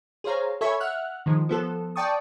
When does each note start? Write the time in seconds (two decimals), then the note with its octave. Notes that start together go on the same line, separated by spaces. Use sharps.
0.24 G#4 C5 C#5 F5 A#5
0.61 A4 C#5 E5 G#5 B5 C#6
0.80 E5 F#5 F6 F#6
1.26 D#3 F3 G#3
1.49 F3 B3 A4
1.96 D5 G5 A5 C#6 D#6